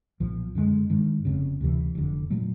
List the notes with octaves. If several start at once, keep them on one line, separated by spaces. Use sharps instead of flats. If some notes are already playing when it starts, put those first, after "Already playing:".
B1 A#2 F3
F#2 D3 F3 G#3
G2 D#3 G#3
F1 F2 C#3
D2 C3 E3
F1 F2 D3
A#2 F#3 A3